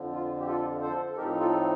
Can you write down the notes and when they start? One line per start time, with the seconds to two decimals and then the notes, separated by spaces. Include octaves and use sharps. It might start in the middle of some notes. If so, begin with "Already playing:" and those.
Already playing: F2 D3 F3
0.12 F4
0.40 G4
0.47 F4 A4
0.81 A4 C5
1.12 A4
1.17 A2 F3 C4 D#4 G4 A#4
1.40 F4 A4